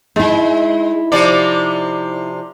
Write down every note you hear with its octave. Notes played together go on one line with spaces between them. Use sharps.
G#3 D#4 E4
C3 F3 D5